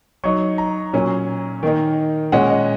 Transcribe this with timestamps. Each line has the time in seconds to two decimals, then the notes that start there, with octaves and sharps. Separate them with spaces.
0.24 F#3 D#4 C#6
0.58 A#5
0.93 A#2 F#3 C#4
1.63 D#3 A#3 D#4
2.32 A#2 G#3 C#4 F#5
2.50 D#5